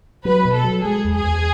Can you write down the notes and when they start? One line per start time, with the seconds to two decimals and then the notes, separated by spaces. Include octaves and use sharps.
0.25 F#3 B4
0.45 B2
0.54 A4
0.64 F#3
0.84 G#3 G#4
1.04 E2
1.14 G#4
1.24 E2